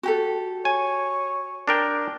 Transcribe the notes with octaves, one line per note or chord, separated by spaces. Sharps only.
F#4 G4 A4
C#5 G#5
D4 A#4 G5